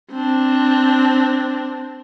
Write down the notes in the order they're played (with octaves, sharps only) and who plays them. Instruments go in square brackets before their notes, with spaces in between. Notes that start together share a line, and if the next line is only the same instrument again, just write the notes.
[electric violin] C4 D4